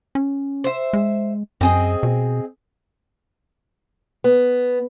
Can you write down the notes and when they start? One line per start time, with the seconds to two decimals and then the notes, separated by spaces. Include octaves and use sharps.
0.15 C#4
0.64 C5 E5
0.93 G#3
1.61 F#2 C4 G#4 D#5
2.03 B2
4.24 B3